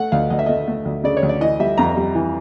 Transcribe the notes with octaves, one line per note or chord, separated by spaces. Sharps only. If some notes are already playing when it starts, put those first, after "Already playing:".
Already playing: A3 F#5
D2 F5
D2 D#5
E5
A3 D#5
A3
D2
C#3 D5
C#5
D2
D5
E3 D#5
G3 E5
F2 A#5
G3
E3